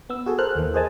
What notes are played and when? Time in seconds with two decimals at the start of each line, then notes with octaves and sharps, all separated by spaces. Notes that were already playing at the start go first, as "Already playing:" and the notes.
0.10 B3 E6
0.26 F#4 G#4 A4
0.38 A4 A#4 C5 F6 F#6
0.56 D#2 E3
0.74 G#4 A#4 C5 D#5 G#5 A5